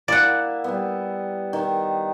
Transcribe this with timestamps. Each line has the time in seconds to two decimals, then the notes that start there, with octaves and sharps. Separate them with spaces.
0.08 A#3 E4 G#4 D5 F#5
0.64 G3 B3
1.53 D#3